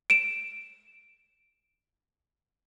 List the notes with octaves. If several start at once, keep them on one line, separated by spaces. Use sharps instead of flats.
D7 E7